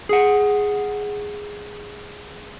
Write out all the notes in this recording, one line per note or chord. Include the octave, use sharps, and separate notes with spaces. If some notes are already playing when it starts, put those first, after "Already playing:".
G#4 F#5